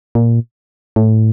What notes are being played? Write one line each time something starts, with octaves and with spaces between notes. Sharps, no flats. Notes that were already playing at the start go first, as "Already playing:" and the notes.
A#2
A2